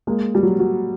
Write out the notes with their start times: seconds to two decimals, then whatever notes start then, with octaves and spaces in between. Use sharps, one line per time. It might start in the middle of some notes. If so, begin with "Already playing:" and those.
0.07 G#3 A#3
0.35 G3
0.43 F#3
0.59 F#3